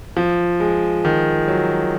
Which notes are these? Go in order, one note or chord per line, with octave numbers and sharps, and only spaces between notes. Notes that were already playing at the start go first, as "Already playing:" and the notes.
F3
G#3
D#3
F#3